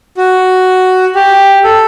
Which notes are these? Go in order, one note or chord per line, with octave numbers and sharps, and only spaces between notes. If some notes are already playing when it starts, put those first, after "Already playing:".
F#4
G4
A4